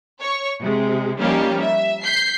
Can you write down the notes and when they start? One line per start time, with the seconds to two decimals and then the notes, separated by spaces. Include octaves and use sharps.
0.20 C#5 C#6
0.61 C3 G#3
1.17 F3 G3 A#3 C#4 D#4 G4
1.60 E5
2.02 G6 B6 C7